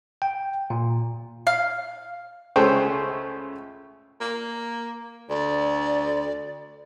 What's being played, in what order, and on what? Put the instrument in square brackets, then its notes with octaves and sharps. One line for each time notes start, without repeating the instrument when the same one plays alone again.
[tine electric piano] G5
A#2
[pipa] F5
[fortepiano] C#2 C#3 A3 C5 C#5 G5
[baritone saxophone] A#3
[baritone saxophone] D2 [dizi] D5